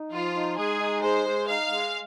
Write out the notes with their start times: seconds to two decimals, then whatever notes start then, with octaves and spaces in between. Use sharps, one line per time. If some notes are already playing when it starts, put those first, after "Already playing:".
Already playing: D#4
0.11 F3 F4
0.35 D#4
0.57 G#3 G#4
0.80 D#4
1.02 G#3 C5
1.26 G#3
1.48 D#4 F5
1.70 G#3